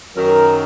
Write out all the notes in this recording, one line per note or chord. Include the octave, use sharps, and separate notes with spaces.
F#2 D#3 F#3 A#4